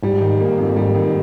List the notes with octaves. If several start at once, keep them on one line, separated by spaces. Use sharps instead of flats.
G#2 G3
D#3
A#3
F2
G3
D#3